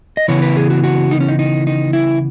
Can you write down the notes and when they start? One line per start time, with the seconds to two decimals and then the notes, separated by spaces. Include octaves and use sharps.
0.17 D#5
0.28 C#3 E3 B3 C#5
0.42 B4
0.56 G#4
0.70 F#4
0.84 F#4
1.11 D#4
1.20 C#4
1.29 D#4
1.39 D#4
1.67 D#4
1.93 E4